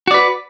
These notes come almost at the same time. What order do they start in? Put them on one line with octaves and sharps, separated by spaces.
F#4 D5 B4